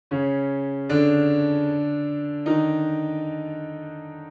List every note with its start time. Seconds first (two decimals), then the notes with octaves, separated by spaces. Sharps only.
0.11 C#3 C#4
0.89 D3 D4
2.46 D#3 D#4